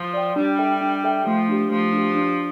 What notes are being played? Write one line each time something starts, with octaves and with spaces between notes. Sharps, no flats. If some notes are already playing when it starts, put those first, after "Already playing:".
Already playing: F3
D5 G5
G3 D4
A4 E5 G5
D4
A4 E5 G5
F3 A3
D4 G4
F3 A3
D4 G4
D4